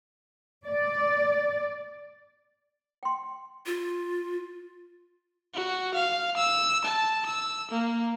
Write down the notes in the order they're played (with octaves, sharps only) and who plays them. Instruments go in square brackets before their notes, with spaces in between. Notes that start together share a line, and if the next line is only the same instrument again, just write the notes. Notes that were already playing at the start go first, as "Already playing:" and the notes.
[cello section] D5
[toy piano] G5 C6
[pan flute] F4
[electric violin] F#4
F5
E6
A5
E6
A#3